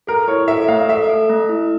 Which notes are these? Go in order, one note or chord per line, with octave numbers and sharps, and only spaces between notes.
A4 A#4
E4 C#5
A4 E5
A3 F5
A4 E5
A4
A3
E4